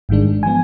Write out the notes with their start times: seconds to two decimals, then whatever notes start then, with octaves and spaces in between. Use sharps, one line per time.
0.09 G#1 G#2 D#3 G#3 D4
0.43 F3 B3 G#5